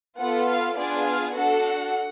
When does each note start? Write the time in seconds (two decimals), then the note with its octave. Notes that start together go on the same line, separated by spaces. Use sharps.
0.18 B3 F4 A4 F#5
0.47 F5
0.76 B3 D4 F4 G#4 D5
1.05 F5
1.34 D4 F#4 A4 F#5